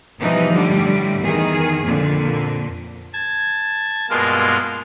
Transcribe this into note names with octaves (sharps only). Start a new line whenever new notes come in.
B2 E3 F3 G3 D#4
A2 D3 G3
E2 D#3 G#4
F2 A#2 D3
A5 G#6
G2 B2 G#3 A#3 F4 A#4